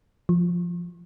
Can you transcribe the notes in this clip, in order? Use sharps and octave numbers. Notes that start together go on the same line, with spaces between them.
F3